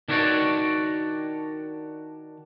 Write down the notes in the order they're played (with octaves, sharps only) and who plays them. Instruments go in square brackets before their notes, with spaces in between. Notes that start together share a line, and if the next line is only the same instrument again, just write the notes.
[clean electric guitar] D#3 D4 E4 F#4 C#5 D5